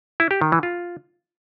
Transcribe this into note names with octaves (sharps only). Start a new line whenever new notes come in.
E4
G4
D#3
E3
F4